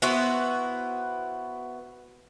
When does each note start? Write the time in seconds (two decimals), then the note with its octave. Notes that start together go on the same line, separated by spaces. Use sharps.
0.02 B3 E4 F#4 C5